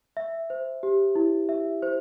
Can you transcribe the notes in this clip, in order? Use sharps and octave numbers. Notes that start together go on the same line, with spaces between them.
E5
C5
G4
E4
E5
C5